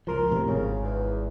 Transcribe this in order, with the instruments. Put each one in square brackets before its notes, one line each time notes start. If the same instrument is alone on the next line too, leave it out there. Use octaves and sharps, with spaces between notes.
[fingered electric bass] C#2 F3 [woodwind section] A#4 C6
[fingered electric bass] E1 A2 C3
[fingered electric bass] G#1 [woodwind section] C#3
[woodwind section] E2